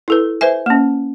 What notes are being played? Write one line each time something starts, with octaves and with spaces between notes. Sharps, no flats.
E4 A4 B4
B4 C5 E5 G#5
A#3 C#4